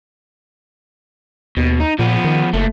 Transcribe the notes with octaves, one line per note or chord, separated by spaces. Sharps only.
D#2 B2
D#4
A#2 F3 B3
D#3
F#1 A#2 A3